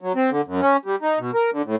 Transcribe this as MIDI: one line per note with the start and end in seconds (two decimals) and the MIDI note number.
0.01 0.12 54
0.16 0.30 60
0.31 0.41 50
0.47 0.61 42
0.61 0.77 61
0.85 0.96 55
1.02 1.19 63
1.19 1.31 47
1.34 1.50 70
1.53 1.62 50
1.65 1.76 45